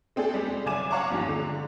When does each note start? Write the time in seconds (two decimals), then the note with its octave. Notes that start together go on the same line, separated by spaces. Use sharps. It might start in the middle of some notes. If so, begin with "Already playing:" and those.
0.16 A3 C4 D4 G#4 A4
0.34 G3 G#3 D4
0.66 F#1 D5 G#5 D6 E7
0.91 C#5 F5 F#5 A#5 C#6 D6
1.10 G2 D#3 F3 G3
1.26 D3 G#3